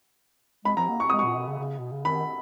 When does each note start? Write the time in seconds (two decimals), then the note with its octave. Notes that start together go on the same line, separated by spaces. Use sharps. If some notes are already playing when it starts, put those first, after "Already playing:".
0.65 G#3 B5
0.77 F3 A#5
0.88 A#3
1.00 C#6
1.10 G#3 D#6
1.19 A#2 C#6
1.35 B2
1.47 C#3
1.59 C#3
1.79 B2
1.92 C#3
2.05 D#3 B5